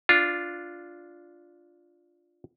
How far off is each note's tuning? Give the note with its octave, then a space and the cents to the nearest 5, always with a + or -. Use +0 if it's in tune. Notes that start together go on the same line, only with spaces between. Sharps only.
D4 +0 F4 +0